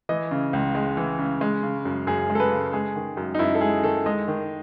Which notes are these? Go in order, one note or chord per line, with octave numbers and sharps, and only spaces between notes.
E3 D#5
C#3
C#2
G#3
E3
C#3
G#3
C#3
F#2
F#2 G#4
G#3
A4
B4
C#3
G#3 G#4
D#3
F#2
D#4
F#2 E4
A4
G#3 G#4
D#3 A4
G#3 D#5
D#3